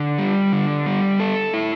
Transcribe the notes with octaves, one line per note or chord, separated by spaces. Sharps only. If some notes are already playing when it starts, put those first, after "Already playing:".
Already playing: D3
G3
D3
G3
A4
E4